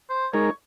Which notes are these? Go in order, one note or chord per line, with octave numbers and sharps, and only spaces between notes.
C5
G#3 D#4 A#4 C#5